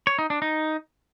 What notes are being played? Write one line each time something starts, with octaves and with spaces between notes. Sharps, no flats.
C#5
D#4
D4
D#4